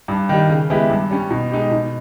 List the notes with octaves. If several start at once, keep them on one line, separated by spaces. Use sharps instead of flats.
G2
D#3 G3
C#3
G#3 B3 E4 G4
G2
G3 C#4
B2
G#3 D#4 G4
B2